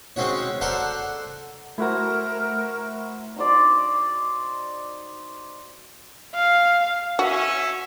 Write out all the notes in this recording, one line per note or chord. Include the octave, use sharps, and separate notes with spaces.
G#3 C4 C#4 F#4 C#5
A4 A#4 C5 D5 F#5 A5
A3 E4 F#4 A#4 C5 A#5
D#4 F#4 C5 D5
F5
C#4 F#4 E5